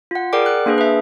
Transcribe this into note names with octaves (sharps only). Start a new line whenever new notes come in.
F4 F#5
G#4 A#4 D5 F#5 G5 D6
F#6
A#3 D4 G#4 B4
B4 E5